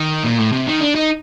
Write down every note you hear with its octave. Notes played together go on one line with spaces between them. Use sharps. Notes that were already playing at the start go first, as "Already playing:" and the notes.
Already playing: D#3
A#2
A2
C3
D#3
D4
D#4